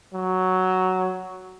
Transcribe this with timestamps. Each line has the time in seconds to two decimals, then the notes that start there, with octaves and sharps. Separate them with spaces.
0.13 F#3